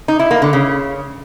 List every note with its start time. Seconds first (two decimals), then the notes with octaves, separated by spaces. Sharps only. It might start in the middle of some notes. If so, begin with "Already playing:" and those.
0.08 D#4
0.19 E4
0.31 A#3
0.42 D3
0.53 C#3